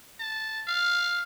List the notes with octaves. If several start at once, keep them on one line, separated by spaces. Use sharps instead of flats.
A5
F5